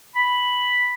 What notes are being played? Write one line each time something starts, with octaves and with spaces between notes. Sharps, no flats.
B5